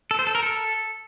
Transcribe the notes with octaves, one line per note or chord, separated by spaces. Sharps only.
A4
C5
A4
A#4
A4